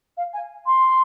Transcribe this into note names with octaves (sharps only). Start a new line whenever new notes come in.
F5
G#5
C6